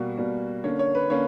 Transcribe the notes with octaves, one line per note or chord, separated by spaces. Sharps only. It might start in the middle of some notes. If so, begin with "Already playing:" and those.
Already playing: B2 G3 A#3 F#4
B2 G3 A#3
D3 A#3 C#4 C#5
C#5
B4
D3 A#3 C#4 C#5